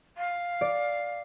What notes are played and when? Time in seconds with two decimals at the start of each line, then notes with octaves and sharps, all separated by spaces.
0.17 F5
0.61 D5